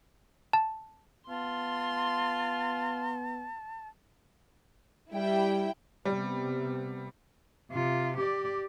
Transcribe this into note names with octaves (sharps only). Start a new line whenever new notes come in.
A5
B3 F4 A5 C6
G3 E4 G5
C3 G3 B3
C3 F4
G4 D5